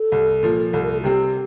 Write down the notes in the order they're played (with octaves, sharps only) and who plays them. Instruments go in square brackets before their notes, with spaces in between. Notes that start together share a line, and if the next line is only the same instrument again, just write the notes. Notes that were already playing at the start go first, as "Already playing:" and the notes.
Already playing: [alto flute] A4
[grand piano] C2
A#2 F3
[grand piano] C2 [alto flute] A4
[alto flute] A#4
A4
F4
[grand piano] C3 G3 C4 [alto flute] G4